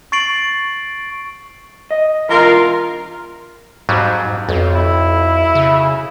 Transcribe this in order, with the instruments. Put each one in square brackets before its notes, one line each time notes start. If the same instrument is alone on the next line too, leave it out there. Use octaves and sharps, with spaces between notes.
[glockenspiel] C#6 A6 C7 D7 F#7
[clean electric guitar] D#5
[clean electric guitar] B2 E3 [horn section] F4 A#4
[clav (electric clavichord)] F2 F#3 G3 [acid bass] G#2
[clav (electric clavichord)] B1 [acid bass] F2
[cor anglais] E4
[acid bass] C#3